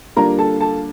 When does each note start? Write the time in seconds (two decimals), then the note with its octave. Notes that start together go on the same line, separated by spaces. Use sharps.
0.16 D3 G3 A#3 D4 F4 A#4 A#5
0.39 A4 A5
0.61 A4 A5